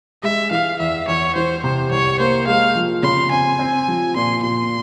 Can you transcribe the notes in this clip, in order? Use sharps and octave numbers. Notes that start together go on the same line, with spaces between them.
G#3 E5
E3 F5
E2 E5
E2 C#5
E3 C5
C3 C5
C2 C#5
A#3 C5
G#3 F5
F3
C#3 C6
C4 G#5
C4
F3
A#2 C6
A#2 C6